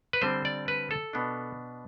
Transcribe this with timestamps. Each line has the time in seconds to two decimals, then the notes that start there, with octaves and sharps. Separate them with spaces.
0.13 B4
0.22 D3 G3 C4 C5
0.45 D5
0.68 B4
0.91 A4
1.13 B2 B3 D4